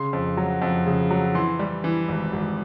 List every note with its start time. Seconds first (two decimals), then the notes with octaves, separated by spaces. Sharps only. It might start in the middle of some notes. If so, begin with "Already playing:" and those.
Already playing: C#3 C6
0.13 F2
0.37 F#3
0.62 F2
0.86 C#3
1.11 F#3
1.35 E3 C6
1.59 G3
1.84 E3
2.08 G#1
2.33 G#1